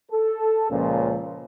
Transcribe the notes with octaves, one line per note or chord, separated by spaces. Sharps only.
A4
C#2 A#2 F3 C#4